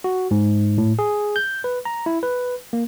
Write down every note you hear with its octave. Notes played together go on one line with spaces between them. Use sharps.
F#4
G#2
A2
G#4
G6
B4
A#5
E4
B4
A#3